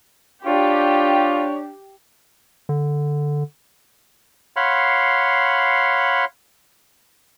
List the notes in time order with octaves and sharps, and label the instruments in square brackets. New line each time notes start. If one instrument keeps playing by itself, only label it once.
[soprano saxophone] D4 [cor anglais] F4 [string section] G4 [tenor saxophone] C#5
[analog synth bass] D3
[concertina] C#5 F5 F#5 B5 C6